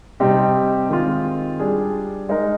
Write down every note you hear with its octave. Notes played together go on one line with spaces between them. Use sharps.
C3 G3 C4 D#4 G4
D#3 G#3 C4 F4
G3 D4 G#4
G#3 D#4 A#4